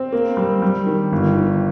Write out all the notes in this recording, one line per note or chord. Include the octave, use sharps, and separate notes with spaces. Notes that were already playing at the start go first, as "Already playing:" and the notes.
Already playing: C4
A#3
G3
G3
D#3
G1
D#3